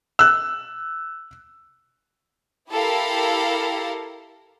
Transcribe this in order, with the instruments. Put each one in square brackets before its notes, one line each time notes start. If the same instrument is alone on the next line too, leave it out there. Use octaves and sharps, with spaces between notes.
[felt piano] E6 F#6
[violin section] E4 G4 A4 A#4 F5